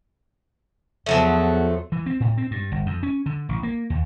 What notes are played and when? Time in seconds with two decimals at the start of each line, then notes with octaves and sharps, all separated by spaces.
1.06 E2 F3 F#3 A3
1.92 E3
2.06 C4
2.20 A2
2.37 C4
2.51 G2
2.72 G1
2.86 F2
3.03 C#4
3.26 D3
3.49 A1
3.63 A#3
3.90 D#2